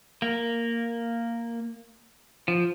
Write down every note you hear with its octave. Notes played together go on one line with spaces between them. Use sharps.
A#3
F3